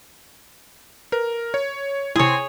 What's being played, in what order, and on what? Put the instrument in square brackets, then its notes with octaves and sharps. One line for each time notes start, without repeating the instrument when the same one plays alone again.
[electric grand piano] A#4 [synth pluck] B4
[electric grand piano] C#5
[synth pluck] C3 E4 [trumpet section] C4 C5 G#5 [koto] G#4 C#5